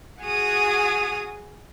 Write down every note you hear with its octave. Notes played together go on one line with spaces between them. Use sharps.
F#4 G#4 G#5 D#6 F6